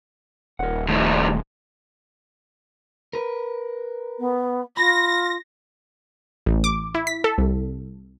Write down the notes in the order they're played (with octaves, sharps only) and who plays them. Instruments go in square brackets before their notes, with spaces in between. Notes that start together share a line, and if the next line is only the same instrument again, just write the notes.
[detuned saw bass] D#1 [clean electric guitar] A#4 F#5
[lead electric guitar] F2 A2 [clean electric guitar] D#3 A3 G4
[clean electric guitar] A#4 B4
[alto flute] B3
[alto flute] F4 [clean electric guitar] B5 [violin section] A#6
[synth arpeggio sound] A1
D6
E4
B6
A4
C2